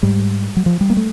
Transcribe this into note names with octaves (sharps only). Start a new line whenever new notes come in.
G#2 G3
F#3
F3
G3
A#3
A3